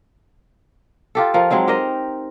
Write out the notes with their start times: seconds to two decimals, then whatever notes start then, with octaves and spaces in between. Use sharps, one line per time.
1.15 F4 G4 A4
1.34 F3 A#4
1.51 F#3 G#3 C4 D#4
1.67 G4 A#4 C5 D#5